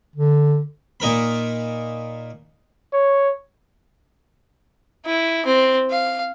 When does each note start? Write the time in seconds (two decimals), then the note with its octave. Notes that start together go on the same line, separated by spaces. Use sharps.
0.16 D3
1.00 A#2 D#4 A#4 B5
2.93 C#5
5.06 E4
5.45 C4
5.90 F5